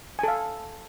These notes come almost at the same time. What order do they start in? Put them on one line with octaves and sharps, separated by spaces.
G#5 A4 F5